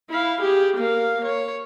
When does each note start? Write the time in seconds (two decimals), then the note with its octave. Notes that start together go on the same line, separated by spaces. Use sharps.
0.10 E4 F5
0.41 G4 G#4
0.77 A#3 F5
1.25 C#5